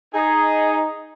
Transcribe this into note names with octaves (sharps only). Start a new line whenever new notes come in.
D#4 G#4